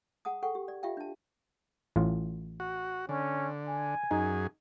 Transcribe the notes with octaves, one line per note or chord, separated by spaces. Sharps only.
G#4 F#5 A5 D#6
G#4 A4 F#5 G5 C#6
G4
D5
F4 G4 E5 F5 G5
D4 A5
A1 A2 F4
F#4
D3 C#4
G#5
F#2 D#4 G#4